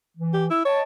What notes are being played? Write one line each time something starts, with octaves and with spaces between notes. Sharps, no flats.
E3
G4
E4 E6
C#5 D#5 G5 A5